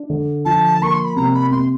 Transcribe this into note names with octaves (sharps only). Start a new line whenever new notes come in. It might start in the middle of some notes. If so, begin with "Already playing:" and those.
Already playing: D4
D3
F3 A5
A#3 C#6
C6
B5
C3 A#5
B5
C3 C6